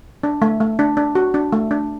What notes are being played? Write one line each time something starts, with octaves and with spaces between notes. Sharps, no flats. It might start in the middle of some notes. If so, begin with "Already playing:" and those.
D4
A3
A3
D4
D4
F#4
D4
A3
D4